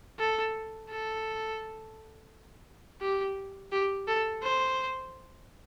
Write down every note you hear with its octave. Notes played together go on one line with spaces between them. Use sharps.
A4
A4
G4
G4
A4
C5